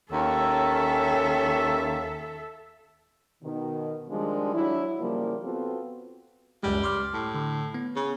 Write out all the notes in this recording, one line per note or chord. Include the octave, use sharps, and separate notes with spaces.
D#2 C#4 A4 E5
B2 D#3
D#3 F3 G3 G#3 D4
F#3 D4 E4
C#3 F3 G3 A#3
B3 C4 F4 F#4 A4
C#2 F#2 G3 G#3
C6 D6 F6
A2
D3
B3
C#3